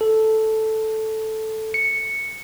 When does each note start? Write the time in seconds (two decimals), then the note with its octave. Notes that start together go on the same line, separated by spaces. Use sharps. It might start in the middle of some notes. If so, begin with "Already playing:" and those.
0.01 A4
1.74 C#7